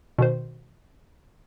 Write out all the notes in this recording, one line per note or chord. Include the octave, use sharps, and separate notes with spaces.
B2 D#3 C5